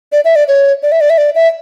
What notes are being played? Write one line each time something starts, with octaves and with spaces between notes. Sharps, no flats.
D5
E5
D5
C#5
D5
E5
D5
E5
D5
E5